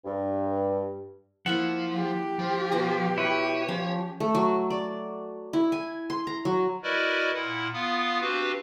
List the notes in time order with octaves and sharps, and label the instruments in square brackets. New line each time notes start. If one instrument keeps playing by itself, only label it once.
[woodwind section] G2
[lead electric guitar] F3 [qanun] A#3 E4 E5 [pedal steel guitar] F#5
[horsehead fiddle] G4
[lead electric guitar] F3
[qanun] B2 F4 A#5
[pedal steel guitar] E4 B4 [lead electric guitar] C#5
[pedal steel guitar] F3 [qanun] C#4
[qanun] A3
F#3
D5
E4
G#5
C6
A#5
F#3
[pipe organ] E4 F#4 A#4 B4 D5 D#5
A#2 E4 F#5
B3 F4 F5 D#6
C4 D4 F#4 G4 B4 F5